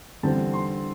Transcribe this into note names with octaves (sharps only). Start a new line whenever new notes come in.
E2 D3 G3 C4 A5
C6